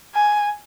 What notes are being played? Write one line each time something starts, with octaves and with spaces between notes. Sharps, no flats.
G#5